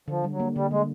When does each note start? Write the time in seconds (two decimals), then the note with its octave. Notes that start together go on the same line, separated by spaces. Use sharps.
0.08 D3 F3
0.24 G3
0.32 F#3
0.40 A#3
0.56 D3 G3
0.71 D3 G#3